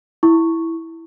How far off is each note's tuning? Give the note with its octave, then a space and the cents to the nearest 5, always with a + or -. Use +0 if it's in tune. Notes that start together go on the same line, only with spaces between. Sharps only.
E4 +0 C#6 +0